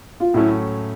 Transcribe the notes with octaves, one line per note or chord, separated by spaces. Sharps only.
F4
A2 F#3 A3 C#4 E4